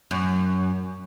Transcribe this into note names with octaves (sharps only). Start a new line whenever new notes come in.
F#2